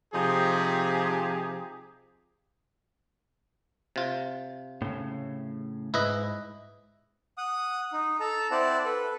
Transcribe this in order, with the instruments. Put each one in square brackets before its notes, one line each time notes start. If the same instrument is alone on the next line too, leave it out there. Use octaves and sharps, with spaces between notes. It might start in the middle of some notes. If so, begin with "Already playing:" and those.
[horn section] C3 F3 D#4 G4 G#4
[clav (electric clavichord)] C3 F4
[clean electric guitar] A2 C#3
[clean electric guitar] G#2 [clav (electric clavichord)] E4 B4 D#5
[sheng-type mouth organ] F#5 D#6
D#4
A4 A5 A#5
C4 E4 C5 D5 F#5 A5
A4 B4